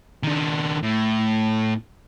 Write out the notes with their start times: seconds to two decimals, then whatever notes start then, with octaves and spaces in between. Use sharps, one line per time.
0.23 D#3 D4
0.83 A2